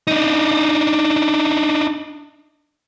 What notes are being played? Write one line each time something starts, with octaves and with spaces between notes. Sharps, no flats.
D4 D#4